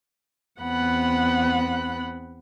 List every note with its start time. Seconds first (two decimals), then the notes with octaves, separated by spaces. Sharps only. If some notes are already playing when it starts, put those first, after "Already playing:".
0.61 E2 B3 C4 F#5 B5 F#6